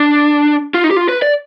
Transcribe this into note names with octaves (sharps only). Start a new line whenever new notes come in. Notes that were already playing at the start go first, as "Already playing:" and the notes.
Already playing: D4
F4
D#4
G4
F4
B4
D5